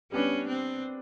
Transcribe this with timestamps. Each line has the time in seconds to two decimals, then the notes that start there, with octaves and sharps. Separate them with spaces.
0.12 G3 B3 C#4 D4
0.48 C4